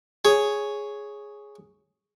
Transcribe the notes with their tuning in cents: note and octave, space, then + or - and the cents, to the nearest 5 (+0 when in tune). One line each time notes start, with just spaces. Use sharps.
G#4 +0 C#5 +0